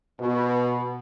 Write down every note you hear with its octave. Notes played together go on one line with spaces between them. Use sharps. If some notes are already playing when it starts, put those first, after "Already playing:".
B2